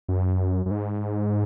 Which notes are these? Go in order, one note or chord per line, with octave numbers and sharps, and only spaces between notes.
F#2
F#2
G#2